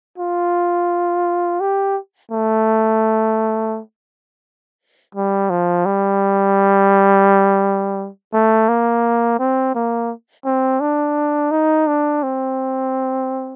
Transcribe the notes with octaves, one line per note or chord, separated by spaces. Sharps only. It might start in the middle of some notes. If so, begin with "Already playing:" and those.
F4
G4
A3
G3
F3
G3
A3
A#3
C4
A#3
C4
D4
D#4
D4
C4